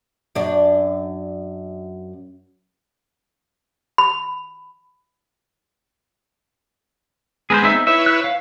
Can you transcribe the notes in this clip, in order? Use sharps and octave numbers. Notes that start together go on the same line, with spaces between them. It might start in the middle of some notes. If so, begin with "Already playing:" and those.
F#2 D4
B5
G#3 B3 G#4 A#4 C5
C4 D#4 E5
E4 B4 C#5 E5
F#6
F5